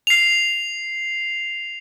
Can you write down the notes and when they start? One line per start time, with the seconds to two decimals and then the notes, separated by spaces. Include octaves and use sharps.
0.07 C7 F7